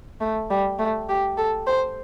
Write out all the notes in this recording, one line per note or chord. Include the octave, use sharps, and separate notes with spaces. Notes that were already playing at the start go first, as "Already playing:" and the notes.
A3
G3
A3
G4
A4
C5